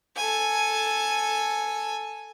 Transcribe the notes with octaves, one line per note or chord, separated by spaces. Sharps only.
A4 G#5